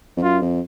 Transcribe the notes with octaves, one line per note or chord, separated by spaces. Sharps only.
F2
F#2 F4
F2